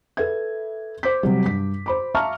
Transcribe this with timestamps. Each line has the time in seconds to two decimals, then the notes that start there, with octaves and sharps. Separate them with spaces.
0.17 A4 B4 E5 G#6
1.03 C5 D6 G6 B6
1.23 C3 F#3 G3
1.44 G2 B6
1.86 C5 B5 D6
2.15 E5 F5 A5 A#5 C#6 F6